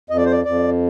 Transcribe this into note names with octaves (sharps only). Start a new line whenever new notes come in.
F2 D#5
D5
C5
D5
F2 D5